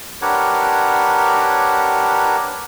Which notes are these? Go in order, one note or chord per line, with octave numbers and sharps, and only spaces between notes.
D4 G4 A#4 B4 C#5 F#5